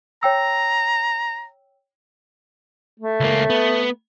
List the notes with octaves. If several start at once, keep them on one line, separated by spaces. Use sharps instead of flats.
C#5 G5 A#5 E6
A3
C#2 A#3
B3